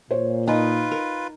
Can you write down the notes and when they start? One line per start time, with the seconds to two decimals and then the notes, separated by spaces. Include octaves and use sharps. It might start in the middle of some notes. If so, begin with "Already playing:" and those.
0.11 A#2 C5 C#5
0.48 D#4 F4 B4 G#5
0.92 A#4